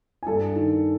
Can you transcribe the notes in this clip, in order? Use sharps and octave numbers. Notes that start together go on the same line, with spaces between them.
G#5
G2 A4 A5
D#3